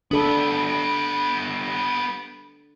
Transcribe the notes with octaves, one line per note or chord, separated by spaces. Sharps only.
G3 B3 D4 A4